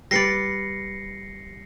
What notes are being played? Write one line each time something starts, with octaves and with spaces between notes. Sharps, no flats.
G3 B4 D5 A#6 C7 C#7